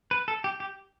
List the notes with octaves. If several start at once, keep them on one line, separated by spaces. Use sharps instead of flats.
B4
A4
G4
G4